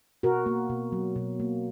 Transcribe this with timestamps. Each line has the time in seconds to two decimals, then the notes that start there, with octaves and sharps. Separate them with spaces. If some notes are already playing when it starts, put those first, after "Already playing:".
0.23 B2 F#4 A#4
0.46 A#3
0.70 B2
0.92 F#3
1.16 B2
1.40 A#3